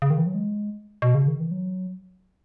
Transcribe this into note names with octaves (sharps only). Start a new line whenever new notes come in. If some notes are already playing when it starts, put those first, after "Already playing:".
C#3
D#3
E3
F#3
G#3
B2
C#3
D#3
E3
F#3